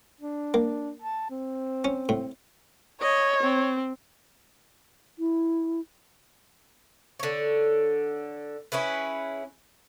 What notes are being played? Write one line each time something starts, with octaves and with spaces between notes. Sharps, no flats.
D4
A#3
A5
C4
C#4
A2
C#5 D#5
C4
E4
D3 C#5
C#4 E4 G#4 B4